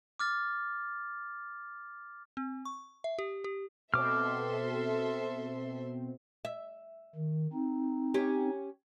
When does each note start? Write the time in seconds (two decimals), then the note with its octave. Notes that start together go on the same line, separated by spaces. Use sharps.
0.19 D6 F6 A6
2.37 C4
2.65 C#6
3.04 E5
3.19 G4
3.44 G4
3.94 B2 C4 A4 E5 C6 D6 F6
6.45 E5
7.16 D#3
7.53 C4 D#4
8.14 C#4 G4